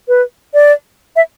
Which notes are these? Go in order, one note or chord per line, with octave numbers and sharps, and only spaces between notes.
B4
D5
E5